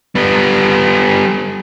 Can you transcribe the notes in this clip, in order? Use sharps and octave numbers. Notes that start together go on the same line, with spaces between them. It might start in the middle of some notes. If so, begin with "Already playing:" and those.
G3 B3